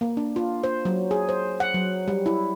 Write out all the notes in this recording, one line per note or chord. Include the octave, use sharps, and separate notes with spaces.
A#3
D4
F4
C5
F#3
G#4
C5
F#5
F#3
G3
E4